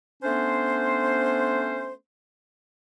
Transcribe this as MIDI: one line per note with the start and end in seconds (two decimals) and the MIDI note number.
0.23 1.93 57
0.23 1.93 59
0.23 1.93 61
0.23 1.93 62
0.23 1.93 72